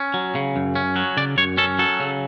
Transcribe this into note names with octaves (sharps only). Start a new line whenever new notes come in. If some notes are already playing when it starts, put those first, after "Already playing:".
Already playing: C#4
F#3
C#3
F#2
C#4
F#3
C#3 D5
F#2 C#5
C#4 A4
F#3 A4
C#3